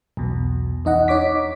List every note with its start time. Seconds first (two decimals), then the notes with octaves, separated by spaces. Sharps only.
0.17 B1 E2 B2
0.85 E2 D#4 D#5 F#5
1.08 D#4 C#5 D6 B6